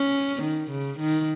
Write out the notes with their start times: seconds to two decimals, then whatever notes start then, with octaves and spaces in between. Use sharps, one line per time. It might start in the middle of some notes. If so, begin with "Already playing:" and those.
Already playing: C#4
0.43 D#3
0.71 C#3
0.99 D#3